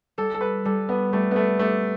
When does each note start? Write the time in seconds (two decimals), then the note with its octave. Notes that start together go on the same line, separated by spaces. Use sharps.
0.18 G3 A4
0.34 A4
0.41 B4
0.65 G3 A4
0.89 B3
1.13 G3 A3
1.31 B3
1.36 A3
1.59 A3 G4